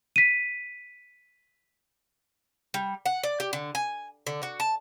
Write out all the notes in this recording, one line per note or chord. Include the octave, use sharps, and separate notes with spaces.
B6 D#7
G3
F#5
D5
G4
D3
G#5
D3
F#4
A5